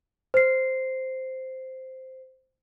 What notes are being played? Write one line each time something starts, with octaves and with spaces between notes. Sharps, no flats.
C5 C7